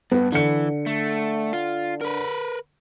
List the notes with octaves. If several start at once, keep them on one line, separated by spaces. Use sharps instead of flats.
G2 B3
D3 E3 C#7
A3
F4
A#4 B4